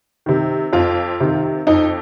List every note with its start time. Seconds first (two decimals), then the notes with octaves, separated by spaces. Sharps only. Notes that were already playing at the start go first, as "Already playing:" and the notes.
0.26 C3 D#3
0.73 F2 F4
1.20 C3 D#3
1.67 F2 D#4